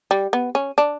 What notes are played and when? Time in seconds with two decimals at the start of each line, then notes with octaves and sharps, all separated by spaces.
0.11 G3
0.33 B3
0.55 C#4
0.78 D4